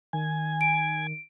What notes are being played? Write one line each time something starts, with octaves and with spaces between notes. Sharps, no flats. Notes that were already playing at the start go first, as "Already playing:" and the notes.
D#3 G#5
D7